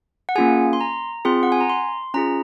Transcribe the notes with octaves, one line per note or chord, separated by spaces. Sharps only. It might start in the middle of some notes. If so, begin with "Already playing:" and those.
F#5
A#3 C#4 F4 G#4 G#5
C6
A#5
C4 F4 G#4 C6
F#5
G#5
A#5
C6
C#4 F4 G#4 A#5